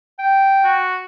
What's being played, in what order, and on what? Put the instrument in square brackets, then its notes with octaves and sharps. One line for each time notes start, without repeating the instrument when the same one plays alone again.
[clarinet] G5
[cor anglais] F#4